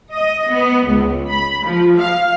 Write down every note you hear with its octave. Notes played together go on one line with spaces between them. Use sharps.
D#5
B3
C#2
B5
F3
F5